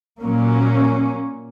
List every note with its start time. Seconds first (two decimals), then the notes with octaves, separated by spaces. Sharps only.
0.23 A#2 F#3 A#3 C#4